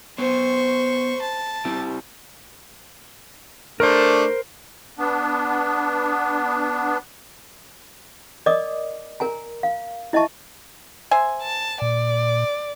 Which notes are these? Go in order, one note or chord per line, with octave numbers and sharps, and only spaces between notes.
B3 C5 C#5 C#6
A5
C4 E4 G4
A3 D4 A#4 C5
B3 D4
A#4 D5 D#5 D6 D#6
A#4 G#5 A#5
F5
E4 D#5 E5 A5 C#6
C5 E5 G#5
A5
A#2 D5